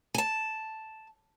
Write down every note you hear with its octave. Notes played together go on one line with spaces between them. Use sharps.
G#5 A5